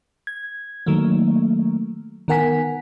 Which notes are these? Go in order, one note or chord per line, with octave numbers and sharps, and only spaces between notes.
G#6
D#3 F#3 A3 A#3
D#3 B3 A#4 F#5 G#5 B6